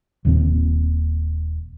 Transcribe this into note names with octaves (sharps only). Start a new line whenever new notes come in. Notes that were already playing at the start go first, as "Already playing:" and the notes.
D#1 D#2 A#2 C4